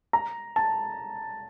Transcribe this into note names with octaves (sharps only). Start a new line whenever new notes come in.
A#5
A5